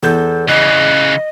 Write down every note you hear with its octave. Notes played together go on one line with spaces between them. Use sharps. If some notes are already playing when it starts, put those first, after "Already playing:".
E2 A4 G6
C#3 E3 D#5 F#6